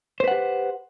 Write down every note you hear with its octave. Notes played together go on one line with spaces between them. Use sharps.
G4 B4 C5 F#5